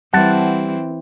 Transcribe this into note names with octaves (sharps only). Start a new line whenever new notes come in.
E3 G3 C4 F#5 A5